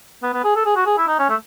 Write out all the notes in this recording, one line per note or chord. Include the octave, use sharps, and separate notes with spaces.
B3
B3
G#4
A4
G#4
F#4
G#4
E4
D#4
C#4
A3